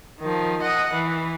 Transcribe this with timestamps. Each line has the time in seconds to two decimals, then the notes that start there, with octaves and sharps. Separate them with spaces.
0.21 D#3 F3
0.62 D#5 F#5
0.94 E3